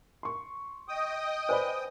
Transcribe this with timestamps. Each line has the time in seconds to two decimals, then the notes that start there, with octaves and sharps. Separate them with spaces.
0.23 C6 C#6
0.88 D#5 G5 D#6
1.49 B4 C5 D5 G#5 B5 C6